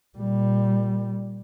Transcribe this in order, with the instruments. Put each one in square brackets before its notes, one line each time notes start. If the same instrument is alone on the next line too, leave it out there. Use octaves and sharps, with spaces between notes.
[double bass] A#2 G3